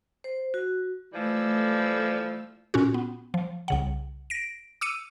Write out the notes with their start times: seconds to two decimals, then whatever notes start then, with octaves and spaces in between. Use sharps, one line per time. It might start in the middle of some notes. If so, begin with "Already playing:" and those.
0.24 C5
0.54 F#4
1.13 E3 F3 G3 A3 E6
2.74 A#2 C#4 F4 F#4
2.94 B3
3.34 F3
3.68 C2 C#3 F#5
4.30 A#6 D7
4.81 D6 E6 C#7 D#7